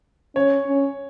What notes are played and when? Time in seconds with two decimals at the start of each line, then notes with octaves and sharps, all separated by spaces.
0.36 C#4 C#5
0.67 C#4